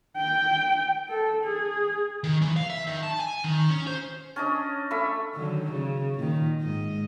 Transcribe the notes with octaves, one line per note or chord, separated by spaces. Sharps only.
G5
A4
G#4
D#3
E3
F5
E5
D#3
A5
G#5
D#3
C#4
C5
C#4 D4 D#5
A3 E5 B5
D3 D#3 F#3
C#3
A#2 D#3
G#2 D#5